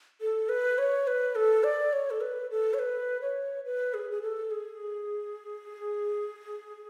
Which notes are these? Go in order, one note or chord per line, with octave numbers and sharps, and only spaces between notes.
A4
B4
C#5
B4
A4
D5
C#5
A4
B4
A4
C#5
B4
C#5
B4
G#4
G#4
A4
G#4